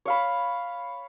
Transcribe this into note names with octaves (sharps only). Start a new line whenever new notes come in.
C#5 F5 B5